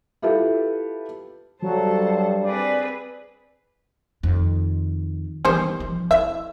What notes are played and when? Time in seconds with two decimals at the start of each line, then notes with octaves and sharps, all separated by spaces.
0.22 E4 F4 G4 A4 B4
1.62 G2 F#3 A4 C5 A5
2.44 C4 G#4 B4 D5
4.23 F2 D#3
5.45 D#3 E3 G3 B3 C5
5.80 F3
6.11 E4 E5